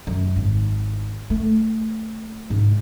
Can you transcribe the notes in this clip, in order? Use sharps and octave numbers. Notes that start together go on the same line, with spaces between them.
F#2
G#1
A3
G#2